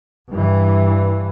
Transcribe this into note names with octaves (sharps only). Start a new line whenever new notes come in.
G2 E3